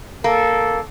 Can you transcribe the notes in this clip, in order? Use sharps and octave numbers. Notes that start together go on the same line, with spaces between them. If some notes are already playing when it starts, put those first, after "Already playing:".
A#3 A4